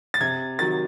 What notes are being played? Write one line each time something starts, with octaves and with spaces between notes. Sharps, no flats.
A6
C3 G#6
D#3 F#3 A6